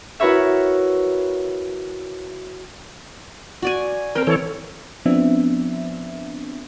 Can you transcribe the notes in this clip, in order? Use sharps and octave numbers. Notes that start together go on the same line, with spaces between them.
E4 F#4 A#4 B4 C#5 E5
F#4 D5 G#5
C4 A#4 G5
E3 A4 C#5
F3 B3 C4 D4 E5